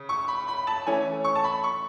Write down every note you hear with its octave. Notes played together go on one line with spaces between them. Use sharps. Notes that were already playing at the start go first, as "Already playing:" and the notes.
Already playing: C#3
C#6
B5
B5
A5
E3 A3 C#4 G#5
C#6
A5
B5
C#6